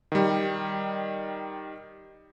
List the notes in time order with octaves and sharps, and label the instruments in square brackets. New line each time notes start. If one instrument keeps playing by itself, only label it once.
[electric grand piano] D#3 G3